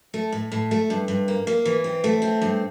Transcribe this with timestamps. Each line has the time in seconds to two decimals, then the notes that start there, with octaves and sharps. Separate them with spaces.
0.14 A3
0.32 A2
0.52 A2
0.71 A3
0.90 G2
1.08 G2
1.28 A#3
1.47 A#3
1.65 E3
1.84 C4
2.04 A3
2.22 C4
2.42 G2